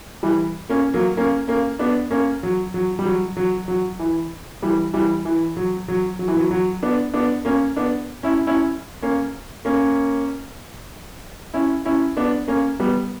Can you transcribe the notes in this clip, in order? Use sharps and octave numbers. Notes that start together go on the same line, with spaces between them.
E3 G3
A#3 C#4
F#3 A#3
A#3 C#4
A#3 C#4
B3 D4
A#3 C#4
F#3
F#3
G3
F#3
F#3
F#3
E3
E3 G3
E3 G3
E3
F#3
F#3
F#3
E3
F#3
F#3
B3 D4
B3 D4
A#3 C#4
B3 D4
C#4 E4
C#4 E4
A#3 C#4
A#3 C#4
C#4 E4
C#4 E4
B3 D4
A#3 C#4
G3 B3